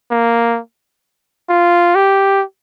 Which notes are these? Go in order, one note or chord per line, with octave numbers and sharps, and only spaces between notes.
A#3
F4
G4